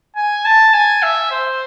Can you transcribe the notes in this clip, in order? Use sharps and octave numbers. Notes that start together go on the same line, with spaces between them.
G#5
A5
G#5
E5
C5